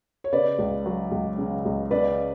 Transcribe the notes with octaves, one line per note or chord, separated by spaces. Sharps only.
C#5
C#3 B4 D5
C#2
F#3
C#2
C#3
C#2
C#3 B4 D5